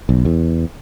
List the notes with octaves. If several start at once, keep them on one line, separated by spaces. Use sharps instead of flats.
B1
E2